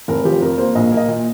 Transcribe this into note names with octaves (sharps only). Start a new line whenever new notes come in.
F1 A#4
F3 G4
F2 A#4
A#3 C5
A#1 D#5
A#3
D#5
A#2